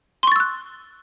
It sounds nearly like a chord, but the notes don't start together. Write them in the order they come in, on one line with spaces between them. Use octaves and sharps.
C6 C#6 A6 E6 F#6